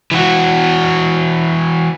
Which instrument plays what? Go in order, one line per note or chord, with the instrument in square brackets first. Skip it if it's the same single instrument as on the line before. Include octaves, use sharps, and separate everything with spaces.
[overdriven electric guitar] E3 F#4